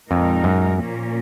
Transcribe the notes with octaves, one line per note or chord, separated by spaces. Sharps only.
F2 A#2 G#3 D#4 A#4
F#2
A#2 F3 A#3 C#4